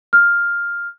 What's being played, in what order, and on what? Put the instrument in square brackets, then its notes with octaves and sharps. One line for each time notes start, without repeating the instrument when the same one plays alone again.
[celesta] F6